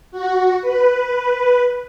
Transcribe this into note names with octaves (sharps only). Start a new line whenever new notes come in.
F#4
B4